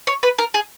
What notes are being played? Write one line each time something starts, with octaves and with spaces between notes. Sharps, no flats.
C#5
B4
A#4
G#4